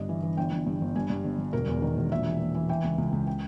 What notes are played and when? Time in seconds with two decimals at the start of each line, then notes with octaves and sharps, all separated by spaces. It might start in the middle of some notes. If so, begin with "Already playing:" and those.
Already playing: G1 G2 D#5
0.09 E3
0.23 E3
0.37 G1 G5
0.52 G1
0.66 G2
0.81 G1
0.96 G2 G#5
1.10 G2
1.24 G1
1.39 G1
1.53 E1 A#4
1.68 E2
1.82 D#3
1.97 E1
2.11 A#1 E5
2.25 E3
2.40 A#1
2.55 E3
2.69 E3 G5
2.84 C#2
2.98 C#2
3.12 C#2
3.27 G5